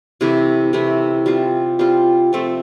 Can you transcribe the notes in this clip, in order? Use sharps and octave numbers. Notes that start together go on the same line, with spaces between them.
C3 E3 A3 E4
C3 E3 A3 E4
G3 C4 F4
G3 C4 F4
F3 A3 C4